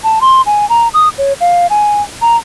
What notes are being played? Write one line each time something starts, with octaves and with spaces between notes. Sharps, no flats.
A5
C6
G#5
A#5
D#6
C#5
F5
G#5
A#5